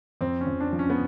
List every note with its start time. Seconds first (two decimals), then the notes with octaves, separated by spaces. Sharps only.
0.21 F2 C4
0.41 C#4
0.47 F2
0.60 D4
0.73 F3
0.79 C#4
0.90 B3